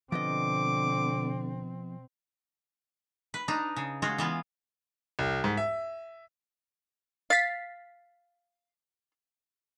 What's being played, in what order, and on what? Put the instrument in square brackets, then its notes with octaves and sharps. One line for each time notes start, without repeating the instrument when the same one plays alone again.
[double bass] B2 C4 [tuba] D3 [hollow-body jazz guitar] F3 B3 D#5 [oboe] D6
[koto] B4
D4 D#4
C#3
G#3 F4 F#4
E3 B3 F4
[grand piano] C2
G#2
E5
[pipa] F5 [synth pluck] A6 B6